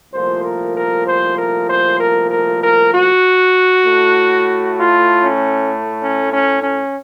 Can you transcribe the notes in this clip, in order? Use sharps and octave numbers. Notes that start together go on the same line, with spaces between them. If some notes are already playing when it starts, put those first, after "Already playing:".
C2 A#2 F3 A3 C5
A#4
A#4
C5
A#4
C5
A#4
A#4
A#4
F#4
A2 A3
F4
C#4
C#4
C#4
C#4